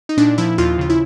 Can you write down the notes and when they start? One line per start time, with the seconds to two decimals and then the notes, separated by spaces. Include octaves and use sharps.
0.09 D#4
0.17 A#2 D4
0.38 F3 E4
0.58 D#2 F4
0.78 C#3 F4
0.90 E4